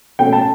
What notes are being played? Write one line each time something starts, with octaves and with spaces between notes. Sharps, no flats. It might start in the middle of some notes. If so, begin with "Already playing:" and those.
B2 A3 C#4 G5
A5